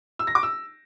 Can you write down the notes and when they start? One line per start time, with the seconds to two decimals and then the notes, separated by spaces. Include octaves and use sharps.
0.19 E6
0.27 A#6
0.35 D6
0.43 E6